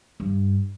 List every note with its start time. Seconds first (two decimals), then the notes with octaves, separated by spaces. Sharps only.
0.20 G2